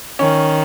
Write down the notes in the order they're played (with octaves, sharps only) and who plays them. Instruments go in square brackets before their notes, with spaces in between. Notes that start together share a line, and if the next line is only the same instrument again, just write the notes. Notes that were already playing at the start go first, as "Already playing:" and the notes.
[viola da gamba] D#3 [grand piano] C#4